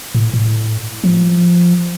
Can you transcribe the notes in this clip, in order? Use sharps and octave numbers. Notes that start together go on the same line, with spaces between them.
A2
A2
F3